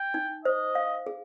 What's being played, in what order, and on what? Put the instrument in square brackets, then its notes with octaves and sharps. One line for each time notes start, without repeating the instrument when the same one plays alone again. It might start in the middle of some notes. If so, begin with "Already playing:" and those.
Already playing: [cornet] G5
[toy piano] D#4
[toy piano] C5 [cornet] D#5
[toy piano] F5
G#4